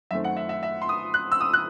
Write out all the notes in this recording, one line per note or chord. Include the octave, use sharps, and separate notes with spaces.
F#2 D#3 A3 C4 E5
F#5
E5
E5
E5
C6
D#6
F#6
E6
D#6
F#6